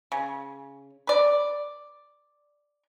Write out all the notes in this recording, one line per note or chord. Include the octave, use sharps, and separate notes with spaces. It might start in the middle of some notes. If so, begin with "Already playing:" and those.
C#3
B4 D5